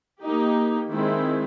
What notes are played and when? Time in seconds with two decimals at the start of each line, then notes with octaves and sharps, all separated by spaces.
0.22 A#3 D#4 G4
0.90 D#3 G#3 C4 E4